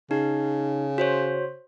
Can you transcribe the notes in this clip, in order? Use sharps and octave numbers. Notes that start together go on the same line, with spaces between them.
C#3 D#4
F#4 C5 C#5